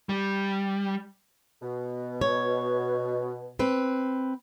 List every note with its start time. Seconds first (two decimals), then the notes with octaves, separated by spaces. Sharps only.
0.09 G3
1.62 B2
2.21 C#5
3.59 C4 B4